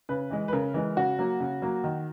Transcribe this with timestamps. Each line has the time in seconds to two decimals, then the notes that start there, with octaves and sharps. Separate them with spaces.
0.09 C#3 B4
0.30 E3 G#3
0.48 B4
0.53 C#3 A#4
0.74 E3 G#3
0.97 C#3 F#4
1.19 F#3 A#3
1.40 C#3
1.62 F#3 A#3
1.84 D#3